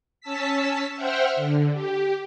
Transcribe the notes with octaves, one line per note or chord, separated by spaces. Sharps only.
C#4 A5 E6 B6
C5 E5 F#5 G5 F6
D3
G4